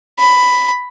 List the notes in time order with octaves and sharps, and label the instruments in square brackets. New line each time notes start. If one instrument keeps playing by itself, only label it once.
[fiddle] B5